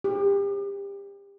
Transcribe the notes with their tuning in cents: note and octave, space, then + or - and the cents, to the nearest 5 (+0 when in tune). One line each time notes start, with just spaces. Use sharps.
G4 +30